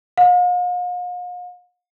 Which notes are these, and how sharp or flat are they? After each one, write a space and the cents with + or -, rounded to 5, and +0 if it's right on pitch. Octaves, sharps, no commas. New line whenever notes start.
F5 +45